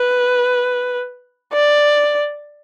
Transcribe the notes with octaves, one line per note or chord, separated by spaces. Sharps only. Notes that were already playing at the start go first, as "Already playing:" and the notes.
Already playing: B4
D5